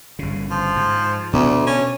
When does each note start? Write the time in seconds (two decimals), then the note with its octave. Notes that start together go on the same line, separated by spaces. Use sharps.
0.19 G1 C#3
0.51 F3
0.76 G#2
1.33 D2 B2 B3
1.67 C#4